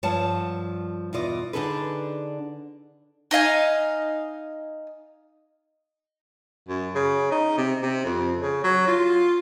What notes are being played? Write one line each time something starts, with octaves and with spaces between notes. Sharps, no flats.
G2 F3 C#5 F#5 A5
E2 B2 F4 D5 D#5
D3 D4 D#4 G#4 A4 B4
D#4 D#5 F5 G#5
F#2
C#3
D#4
C3
C3
F2
C#3
F#3
F4